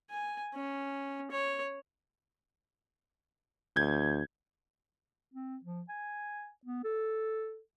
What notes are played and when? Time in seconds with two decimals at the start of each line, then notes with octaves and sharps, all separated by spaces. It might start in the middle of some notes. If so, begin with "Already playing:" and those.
0.10 G#5
0.55 C#4
1.31 C#5
3.76 D2 G6 G#6
5.34 C4
5.64 F3
5.89 G#5
6.65 B3
6.84 A4